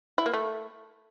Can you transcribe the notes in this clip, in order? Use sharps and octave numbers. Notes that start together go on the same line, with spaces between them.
E4
A#3
A3